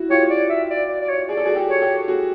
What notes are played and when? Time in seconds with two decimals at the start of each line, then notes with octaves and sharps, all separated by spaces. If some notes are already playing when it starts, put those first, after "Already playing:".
Already playing: E4 F#4
0.10 F4 G4 C#5
0.30 D5
0.50 E5
0.70 D5
0.89 D5
1.02 D5
1.09 C#5
1.28 G#4 D5
1.37 A4
1.46 F#4 G#4
1.55 G4 A4
1.68 C#5
1.81 G4 A4
2.08 F#4 G#4